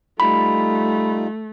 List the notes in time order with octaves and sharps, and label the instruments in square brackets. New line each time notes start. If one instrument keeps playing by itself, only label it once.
[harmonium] G3 D#4 F4 [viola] A3 [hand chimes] B5